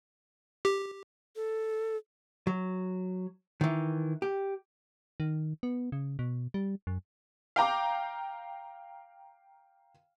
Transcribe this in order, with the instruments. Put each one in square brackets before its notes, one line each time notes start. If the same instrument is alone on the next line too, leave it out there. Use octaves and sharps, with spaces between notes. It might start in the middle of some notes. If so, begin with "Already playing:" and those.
[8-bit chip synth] G4
[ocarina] A4
[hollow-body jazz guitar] F#3
D#3 E3
G4
[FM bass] D#3
B3
C#3
B2
G3
F#2
[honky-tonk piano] F5 G5 A#5 D6